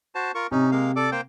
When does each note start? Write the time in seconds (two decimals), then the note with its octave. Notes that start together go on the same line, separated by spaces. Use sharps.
0.15 F#4 C5 A5
0.35 F4 A#4 C#6
0.51 C3 C#4 D#4
0.71 G#3 A#3 F5
0.96 A4 D5 D6
1.12 A#3 C5 G5